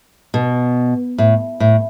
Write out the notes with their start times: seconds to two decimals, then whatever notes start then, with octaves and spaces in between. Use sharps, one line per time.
0.34 B2
1.18 A2
1.60 A2